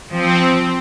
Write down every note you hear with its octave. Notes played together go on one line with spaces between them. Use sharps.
F3 C4